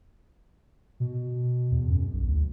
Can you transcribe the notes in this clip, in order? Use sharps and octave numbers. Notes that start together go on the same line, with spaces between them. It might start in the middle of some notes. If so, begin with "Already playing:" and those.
B2
E2
F#2
B1
D2